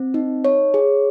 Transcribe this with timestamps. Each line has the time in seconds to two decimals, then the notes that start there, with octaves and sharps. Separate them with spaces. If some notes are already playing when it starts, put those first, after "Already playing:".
Already playing: C4
0.14 D#4
0.45 C#5
0.74 G#4